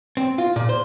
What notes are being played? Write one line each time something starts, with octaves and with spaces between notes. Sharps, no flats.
C4
F4
A#2
C5